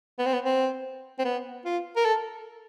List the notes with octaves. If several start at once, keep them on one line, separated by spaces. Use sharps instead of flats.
B3
C4
B3
C4
C4
B3
F4
A#4
A4